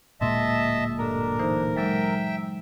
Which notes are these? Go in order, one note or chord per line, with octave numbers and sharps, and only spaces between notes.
D1 A#2 G#3 D#5 E5 A5 C6
G2 D4 A4 A#4
E3 D#4 C5
A#2 F#3 G#3 E5 G5